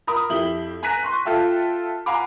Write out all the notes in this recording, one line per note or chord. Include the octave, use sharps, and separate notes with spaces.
A#4 B5 D#6
F2 E4 G4 F#7 G7
G#5 A#5 F#6 A#6 B6 D#7
C6 C#6 F#6
F4 A4 E5 G5
F5 F#5 G#5 A#5 B5 D6